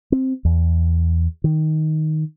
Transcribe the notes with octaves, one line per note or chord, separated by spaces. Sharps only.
C4
E2
D#3